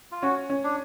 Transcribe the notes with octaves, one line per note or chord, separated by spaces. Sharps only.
F4
C#4 F#4
C#4
D4